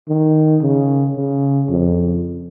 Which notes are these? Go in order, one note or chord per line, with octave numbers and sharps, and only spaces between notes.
D#3
C#3
C#3
F2